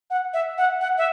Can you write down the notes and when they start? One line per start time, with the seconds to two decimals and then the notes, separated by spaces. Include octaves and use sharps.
0.10 F#5
0.34 E5
0.58 F#5
0.81 F#5
0.98 E5